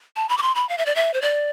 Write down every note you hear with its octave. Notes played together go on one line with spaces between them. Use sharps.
A5
B5
D6
C6
B5
F5
E5
D5
E5
C5
D5